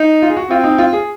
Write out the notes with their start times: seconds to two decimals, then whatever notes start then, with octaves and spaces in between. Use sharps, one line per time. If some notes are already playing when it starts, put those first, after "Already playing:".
Already playing: D#4
0.22 F4
0.29 G#4
0.37 F#4
0.50 C4 F4
0.64 D#4
0.78 F4
0.93 G#4